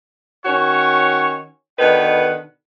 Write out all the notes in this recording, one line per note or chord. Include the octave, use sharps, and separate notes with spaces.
D#3 C#4 F#4 C#5
B2 D3 D#3 B4 F#5